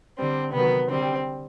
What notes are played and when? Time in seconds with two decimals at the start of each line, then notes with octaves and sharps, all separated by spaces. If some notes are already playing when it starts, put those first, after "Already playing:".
0.18 D3 G3 C4
0.53 C3 D#3 F#3 B3
0.90 D3 G3 C4